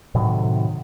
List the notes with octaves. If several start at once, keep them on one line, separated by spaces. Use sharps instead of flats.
A2 C3 D#3 F#3